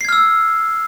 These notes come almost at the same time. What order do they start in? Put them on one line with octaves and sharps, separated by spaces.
C7 G#6 F6 E6